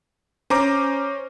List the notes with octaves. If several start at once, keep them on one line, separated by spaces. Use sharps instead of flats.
C#4 C5 A#5 D6